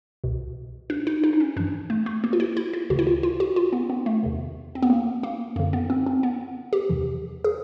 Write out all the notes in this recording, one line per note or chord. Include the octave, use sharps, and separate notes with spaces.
C2 B2
D4
D#4
D#4
D4
C#4
G2 E3 D4
A3
A3
A#3
F4
E4
E4
F4
D2 C#3 E3 F#4
E4
F4
F4
F#4
F4
B3
B3
A3
E2 C3 D#3
C4
B3
A#3
A#3
F#2 D3 A#3
B3
C4
C4
B3
G4
E2 C3 E3
G#4